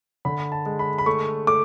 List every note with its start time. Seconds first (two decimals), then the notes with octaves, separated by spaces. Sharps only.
0.25 D3 B5
0.52 A5
0.66 G#3
0.79 B5
0.98 B5
1.06 A3 C#6
1.47 A3 D6